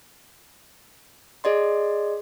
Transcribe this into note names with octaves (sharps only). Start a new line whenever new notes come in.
G#4 D5 D#5 C6